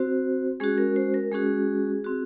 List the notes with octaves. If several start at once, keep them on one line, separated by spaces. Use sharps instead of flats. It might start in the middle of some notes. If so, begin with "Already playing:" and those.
Already playing: C4 F#4 C5
G#3 C#4 F#4 G#4
A#4
C5
A#4
G#3 C#4 F#4 G#4
C4 F#4